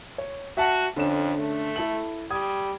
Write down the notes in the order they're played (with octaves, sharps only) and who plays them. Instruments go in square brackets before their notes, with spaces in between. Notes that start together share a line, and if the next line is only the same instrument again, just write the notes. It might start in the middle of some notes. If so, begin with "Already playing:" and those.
[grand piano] C#5
[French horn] F#4 [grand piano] E5 F#5 A5
[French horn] F2 [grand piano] D3 C#4 E7
[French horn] A3
[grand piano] E4 A4 F#7
[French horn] G3 [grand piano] D#6 G#6